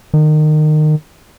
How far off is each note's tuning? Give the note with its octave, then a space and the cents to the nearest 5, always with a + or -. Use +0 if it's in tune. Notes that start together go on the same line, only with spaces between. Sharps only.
D#3 -25